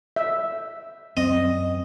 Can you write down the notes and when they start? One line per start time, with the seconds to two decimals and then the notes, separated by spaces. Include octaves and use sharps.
0.16 E5
1.17 F#2 C4 D#5